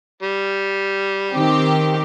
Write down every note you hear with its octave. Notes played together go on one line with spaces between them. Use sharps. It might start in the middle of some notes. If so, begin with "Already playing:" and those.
G3
D#3 C4 G4